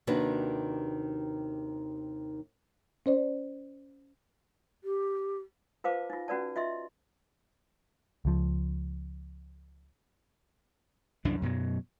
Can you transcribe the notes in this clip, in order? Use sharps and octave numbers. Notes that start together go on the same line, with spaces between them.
D#2 C3 D#3 D4 F#4 B4
C#4 C5 D5
G4
F4 B4 C5 F5 A5 D6
D#4 F4
C#4 F#4 B4 D5 A5
F4 D#5 E5 C6
C#2 F3
C2 F#2 E3 D4
F#2 B2 F#3